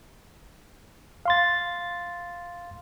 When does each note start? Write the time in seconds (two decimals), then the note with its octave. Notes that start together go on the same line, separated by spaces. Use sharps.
1.26 F5 C6 A6